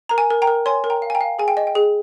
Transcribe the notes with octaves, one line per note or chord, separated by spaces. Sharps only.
A#4 A#5
G#5
A#4
G5 A#5
A#4
C#5 G#5 C6
A#4
G5 A#5
F5
G#5
G5 A#5
F5
G#4 G#5
G5
D#5
G5
G#4